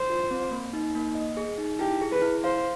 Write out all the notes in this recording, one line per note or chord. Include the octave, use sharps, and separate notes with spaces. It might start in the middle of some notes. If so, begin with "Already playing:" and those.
Already playing: C5
F4
C4
A#3
D#4
A#3
D#5
G#4
D#4
E4 G4
G#4
B4
E4
C5 F5